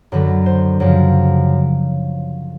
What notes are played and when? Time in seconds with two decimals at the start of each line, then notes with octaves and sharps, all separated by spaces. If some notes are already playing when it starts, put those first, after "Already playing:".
0.12 F#2 D3 F#3 B4
0.46 C5
0.80 F#2 C#3 F3